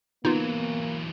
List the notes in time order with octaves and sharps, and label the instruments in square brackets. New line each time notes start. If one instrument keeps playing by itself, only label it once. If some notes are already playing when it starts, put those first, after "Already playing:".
[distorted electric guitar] E3 F#3 [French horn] A#3 [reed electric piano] B3 [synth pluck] D#4 F4